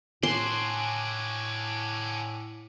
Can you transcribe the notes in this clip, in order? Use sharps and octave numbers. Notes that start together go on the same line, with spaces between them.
A2 D4 F#4 G#5 C6